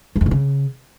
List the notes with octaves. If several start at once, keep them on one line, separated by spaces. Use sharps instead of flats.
F#2
F2
A#2
C#3